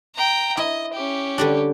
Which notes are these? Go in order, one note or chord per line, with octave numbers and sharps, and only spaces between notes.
G5 A#5
E4 D#5
C#4 G4
D3 G3 D4